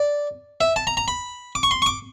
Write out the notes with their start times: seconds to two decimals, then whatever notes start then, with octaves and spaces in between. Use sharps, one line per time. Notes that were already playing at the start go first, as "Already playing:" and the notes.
Already playing: D5
0.61 E5
0.76 A5
0.87 A#5
0.97 A#5
1.08 B5
1.55 D6
1.63 C#6
1.71 C6
1.82 C#6
1.86 D6